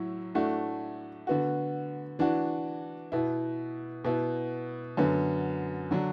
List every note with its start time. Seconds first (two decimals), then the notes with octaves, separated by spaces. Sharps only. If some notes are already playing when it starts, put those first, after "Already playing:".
Already playing: A2 F#3 E4
0.34 A2 A3 D4 F#4
1.27 D3 B3 F#4
2.19 E3 D4 F#4
3.12 B2 B3 E4
4.04 B2 B3 E4
4.97 F#2 D3 B3
5.91 D3 F#3 D4